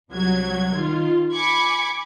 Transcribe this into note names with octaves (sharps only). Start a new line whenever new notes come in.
C2 F#3 G#6
D#3 F4
G#5 B5 D6 G#6 C#7